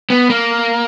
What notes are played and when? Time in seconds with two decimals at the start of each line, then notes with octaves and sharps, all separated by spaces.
0.10 B3
0.30 A#3